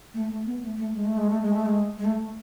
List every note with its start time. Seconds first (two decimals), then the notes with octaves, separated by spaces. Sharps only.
0.14 A3
0.30 A3
0.46 B3
0.62 A3
0.77 A3
0.93 G#3
1.05 A3
1.18 G#3
1.30 A3
1.41 G#3
1.54 A3
1.66 G#3
1.98 G#3
2.05 A3